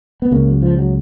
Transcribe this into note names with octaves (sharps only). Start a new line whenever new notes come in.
B3
C#2 C#3 A#3
F#3
F3
F#3